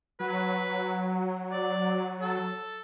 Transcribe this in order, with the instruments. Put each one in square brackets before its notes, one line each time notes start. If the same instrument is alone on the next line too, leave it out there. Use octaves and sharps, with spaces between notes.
[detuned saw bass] F#3 [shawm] B4
[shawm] D5
A4